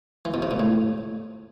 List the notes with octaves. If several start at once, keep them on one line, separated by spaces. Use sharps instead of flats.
E3
B2
C3
A#2
A2